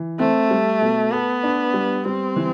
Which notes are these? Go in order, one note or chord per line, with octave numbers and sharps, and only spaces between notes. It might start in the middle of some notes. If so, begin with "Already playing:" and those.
Already playing: E3
A3 C4
G3
B2
B3 A4
D4
G3
G3 C4
E3